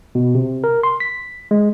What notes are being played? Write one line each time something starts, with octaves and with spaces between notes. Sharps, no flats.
B2
C3
A#4
C6
B6
G#3